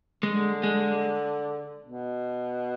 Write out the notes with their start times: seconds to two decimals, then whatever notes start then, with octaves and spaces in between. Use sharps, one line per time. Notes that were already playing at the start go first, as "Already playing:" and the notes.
0.23 D3 G#3
0.63 G#3
1.84 B2